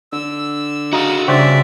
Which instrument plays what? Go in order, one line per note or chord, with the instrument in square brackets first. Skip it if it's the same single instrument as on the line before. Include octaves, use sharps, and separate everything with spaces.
[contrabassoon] D3 [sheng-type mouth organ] E6
[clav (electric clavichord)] D#4 [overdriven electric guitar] F#4 F5
[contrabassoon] G2 [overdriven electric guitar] C#3 [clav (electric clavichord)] F#4 C5 G5 [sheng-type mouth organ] D5 E5